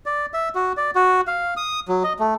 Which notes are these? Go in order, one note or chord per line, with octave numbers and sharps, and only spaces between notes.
D5
E5
F#4
D5
F#4
F5
D#6
F#3
D#5
A3